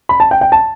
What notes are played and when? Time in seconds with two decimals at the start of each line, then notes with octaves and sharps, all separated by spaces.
0.09 B5
0.20 A5
0.31 G5
0.41 G5
0.52 A5